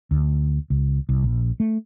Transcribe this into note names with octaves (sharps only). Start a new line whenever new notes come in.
D2
C#2
C2
A#1
A3